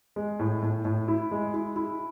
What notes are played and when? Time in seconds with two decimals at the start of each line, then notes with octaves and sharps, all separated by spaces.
0.16 G#3
0.39 A2
0.62 A2
0.85 A2
1.08 E4
1.31 G#3
1.54 E4
1.76 E4